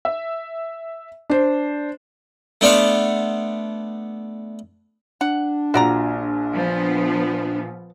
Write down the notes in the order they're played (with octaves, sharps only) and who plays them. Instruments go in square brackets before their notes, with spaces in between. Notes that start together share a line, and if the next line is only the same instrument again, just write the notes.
[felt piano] E5
D4 C5
[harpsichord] A3 B3 D4 C5 F5 F#5
[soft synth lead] D4 [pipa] F#5
[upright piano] A#1 A#2 [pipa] F#4 D5 A#5
[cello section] F3 B3